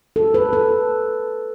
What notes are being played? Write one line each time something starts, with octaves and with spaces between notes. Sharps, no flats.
A4
B4
A4